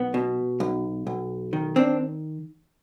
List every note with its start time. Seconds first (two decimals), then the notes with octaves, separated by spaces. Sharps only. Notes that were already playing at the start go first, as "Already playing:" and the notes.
Already playing: B1 B3
0.14 B2
0.60 B1
1.07 B1
1.53 D#3
1.76 C4 D4